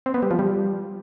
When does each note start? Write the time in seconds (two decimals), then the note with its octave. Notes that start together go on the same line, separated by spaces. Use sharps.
0.06 C4
0.14 B3
0.23 G3
0.31 F3
0.39 G3